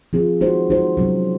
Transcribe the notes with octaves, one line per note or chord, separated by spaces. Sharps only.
F3 C4 F4 G#4
G#3 D#4 F#4 C5
G#3 D#4 F#4 C5
C3 F#3 C#4